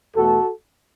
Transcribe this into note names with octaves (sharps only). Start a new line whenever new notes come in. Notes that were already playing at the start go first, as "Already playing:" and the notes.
E2 B2 A3 F#4 A4